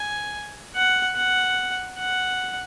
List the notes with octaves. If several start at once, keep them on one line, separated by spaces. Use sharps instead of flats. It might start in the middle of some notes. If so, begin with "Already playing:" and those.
Already playing: G#5
F#5
F#5
F#5